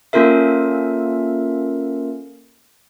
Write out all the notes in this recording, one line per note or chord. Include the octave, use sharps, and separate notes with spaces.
A#3 C#4 F4 A4 A#4 E5